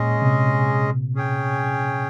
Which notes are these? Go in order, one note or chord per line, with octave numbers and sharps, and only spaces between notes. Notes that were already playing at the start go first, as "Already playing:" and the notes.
Already playing: A#2 G#3 C#4 G#4 D#5
C3
C#4 G#4 C#5 G5